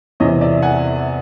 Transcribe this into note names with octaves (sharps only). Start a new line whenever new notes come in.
E2 C3 E3 C#5 D#5
D5 E5
F#5 G#5